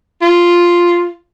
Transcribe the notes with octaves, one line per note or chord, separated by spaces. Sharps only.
F4